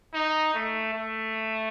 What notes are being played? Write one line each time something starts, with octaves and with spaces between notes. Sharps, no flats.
D#4
A3
A3